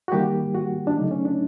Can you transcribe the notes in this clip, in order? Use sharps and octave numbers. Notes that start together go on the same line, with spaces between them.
F#4
D#3 G3 A#3 G4
F#4
D4
C#3 F#3 A3 D#4
C#4
D4